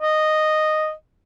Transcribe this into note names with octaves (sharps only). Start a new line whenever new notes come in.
D#5